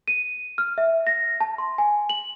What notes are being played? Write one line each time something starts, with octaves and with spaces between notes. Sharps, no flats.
D#7
F6
E5
A#6
A5
C6
G#5
F#7